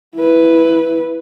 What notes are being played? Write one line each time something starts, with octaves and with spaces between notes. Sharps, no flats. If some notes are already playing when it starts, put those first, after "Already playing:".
E4 B4